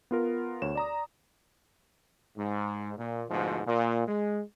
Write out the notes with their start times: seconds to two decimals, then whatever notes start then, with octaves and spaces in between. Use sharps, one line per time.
0.11 B3 F4 A#4
0.62 D2 C#5 E7
0.75 D5 A#5 D#6
2.36 G#2
2.97 A#2
3.29 D2 G#2 B2 F3
3.66 A#2
4.07 G#3